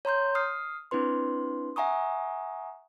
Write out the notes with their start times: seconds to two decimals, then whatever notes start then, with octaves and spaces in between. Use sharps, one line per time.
0.05 C#5 A#5 C6 G6
0.35 D#6 F6 C7
0.91 C4 D4 E4 B4 C6
1.76 E5 F#5 G#5 A#5 C#6 D#6